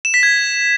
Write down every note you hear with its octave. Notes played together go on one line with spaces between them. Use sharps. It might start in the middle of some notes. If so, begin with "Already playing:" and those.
E7
B6
G#6